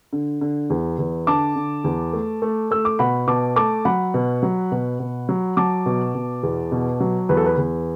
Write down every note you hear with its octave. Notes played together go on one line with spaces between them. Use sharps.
D3
D3
E2
E2
D3 A5 D6
D3
E2
A3
A3
A3 E6
D6
B2 F#5 B5
B2 A5 D6
A3 A5 D6
F#3 F#5 B5
B2
F#3
B2
B2
F#3
F#3 A5 D6
B2
B2
E2
B2
F#3
E2 B4
A4
B4
E2